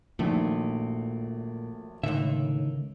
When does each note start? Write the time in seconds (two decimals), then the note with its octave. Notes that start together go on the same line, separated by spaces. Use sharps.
0.19 A#1 F#2 A#2 D#3 A3
2.04 C#2 A2 D3 D#3 E5